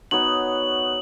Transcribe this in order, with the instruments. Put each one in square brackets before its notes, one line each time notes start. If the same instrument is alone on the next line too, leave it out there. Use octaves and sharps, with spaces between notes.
[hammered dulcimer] B3 D#4 F#4 C#5 [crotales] F#7